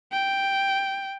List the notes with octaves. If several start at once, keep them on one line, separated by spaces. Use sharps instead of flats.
G5